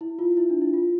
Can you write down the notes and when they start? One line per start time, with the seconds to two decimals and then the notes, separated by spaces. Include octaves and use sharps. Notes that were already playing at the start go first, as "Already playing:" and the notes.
0.01 E4
0.19 F4
0.37 E4
0.50 D4
0.61 E4
0.74 F4